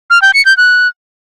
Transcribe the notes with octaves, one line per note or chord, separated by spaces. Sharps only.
F6
G5
C#7
G6
F#6